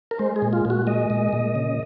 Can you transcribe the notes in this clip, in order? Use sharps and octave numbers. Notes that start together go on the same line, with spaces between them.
A#4
G#3 C5
G#4
A#2
F4
A#2
F#4
G#3 D#5
A#2
A#2
C#3